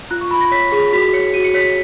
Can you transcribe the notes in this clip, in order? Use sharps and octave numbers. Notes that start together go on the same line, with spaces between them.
F4 F#6
C#6
F4 B5
A#6
C#5 B6
G#4
F#4 B6
C#5 C#7
F#4 D#7
C#7
C#5 B6